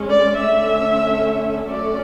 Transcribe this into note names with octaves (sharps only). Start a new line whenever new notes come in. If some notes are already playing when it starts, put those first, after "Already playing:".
Already playing: G#3 C#4
D5
D3 A3 C#4 E5
F#3 A3 C#4 D5